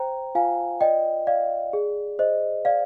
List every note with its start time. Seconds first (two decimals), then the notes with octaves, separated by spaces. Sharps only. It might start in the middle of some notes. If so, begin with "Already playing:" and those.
Already playing: C5 G5 A#5
0.35 F4 F5 G#5
0.81 D5 D#5 G5
1.27 D5 F5
1.73 G#4
2.19 C5 D#5
2.65 D5 F5